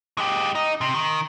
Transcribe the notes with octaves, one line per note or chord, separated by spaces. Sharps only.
G#3 G4
D#4
C3
D#3